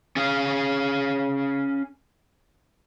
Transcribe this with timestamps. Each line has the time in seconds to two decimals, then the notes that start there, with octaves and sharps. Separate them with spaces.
0.16 C#4 G#4 F5